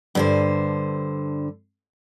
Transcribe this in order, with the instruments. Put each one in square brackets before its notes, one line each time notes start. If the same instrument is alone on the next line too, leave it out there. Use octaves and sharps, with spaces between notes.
[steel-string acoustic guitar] G2 D3 C5